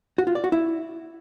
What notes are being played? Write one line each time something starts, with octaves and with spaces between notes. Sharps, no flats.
F#4
F4
D5
F#4
E4